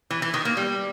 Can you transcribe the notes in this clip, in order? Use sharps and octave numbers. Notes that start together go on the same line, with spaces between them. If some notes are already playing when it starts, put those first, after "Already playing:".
E3
E3
D#3
A#3
G3